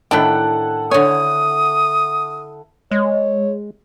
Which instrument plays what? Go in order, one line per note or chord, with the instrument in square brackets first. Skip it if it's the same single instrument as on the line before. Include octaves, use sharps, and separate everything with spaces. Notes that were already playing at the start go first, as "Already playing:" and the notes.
[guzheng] A2 D#3 D4 [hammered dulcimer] E4 A4 F#5 [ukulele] G5
[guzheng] D3 G#5 [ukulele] C#5 [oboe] D#6
[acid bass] G#3 [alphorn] C#5